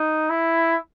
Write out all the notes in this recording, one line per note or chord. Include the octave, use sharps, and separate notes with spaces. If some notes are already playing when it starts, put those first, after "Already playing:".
Already playing: D#4
E4